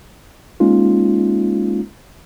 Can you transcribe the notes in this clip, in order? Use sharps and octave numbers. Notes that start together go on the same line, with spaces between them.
G#3 A#3 C#4 D#4 F4